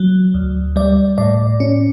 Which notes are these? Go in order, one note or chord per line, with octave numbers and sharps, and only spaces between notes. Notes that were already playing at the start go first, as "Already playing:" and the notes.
Already playing: F#3
D2
G3 D5
A2 D5
C#4